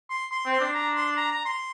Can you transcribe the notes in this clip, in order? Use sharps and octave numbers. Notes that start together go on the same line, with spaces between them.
C6
C6
C4
C6
D4
A#5
C6
A#5
A#5
C6